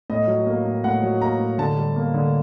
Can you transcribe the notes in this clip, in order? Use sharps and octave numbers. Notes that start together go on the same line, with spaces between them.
A2 D#5
F#3
A#3
A2
A2 F#5
F#3
A#3 A#5
A2
D3 A5
G3
A#3
D3